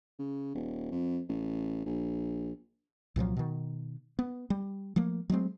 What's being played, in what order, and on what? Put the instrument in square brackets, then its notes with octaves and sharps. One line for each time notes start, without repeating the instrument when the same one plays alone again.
[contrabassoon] C#3
D#1
F2
A1
A#1
[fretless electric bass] C2 A#2 F3 F#3
B2 D#3
B3
G3
F3 A3 A#3
F#3 G#3 A3 C4